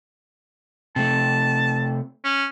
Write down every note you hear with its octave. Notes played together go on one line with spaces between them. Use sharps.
C3 A3 A5
C#4